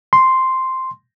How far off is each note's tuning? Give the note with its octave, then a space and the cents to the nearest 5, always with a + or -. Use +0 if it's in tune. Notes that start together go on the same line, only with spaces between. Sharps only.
C6 +0